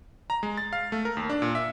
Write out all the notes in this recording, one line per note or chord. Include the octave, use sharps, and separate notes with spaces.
A#5
G#3
A6
F5
A3
A#4
D#2
D4
A#2
E5